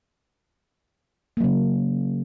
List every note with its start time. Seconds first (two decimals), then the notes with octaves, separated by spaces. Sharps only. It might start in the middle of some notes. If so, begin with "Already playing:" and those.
1.37 A#3
1.40 F#3
1.44 C#3